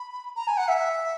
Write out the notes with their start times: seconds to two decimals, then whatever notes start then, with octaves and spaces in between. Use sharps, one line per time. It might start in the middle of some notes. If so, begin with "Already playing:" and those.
Already playing: B5
0.36 A#5
0.48 G#5
0.57 F#5
0.68 E5